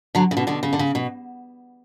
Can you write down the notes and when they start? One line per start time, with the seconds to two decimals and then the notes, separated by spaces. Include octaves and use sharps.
0.15 D3 F#3
0.31 C#3
0.37 B2 D3
0.47 B2 D3
0.63 C#3
0.73 D3
0.79 C#3
0.95 B2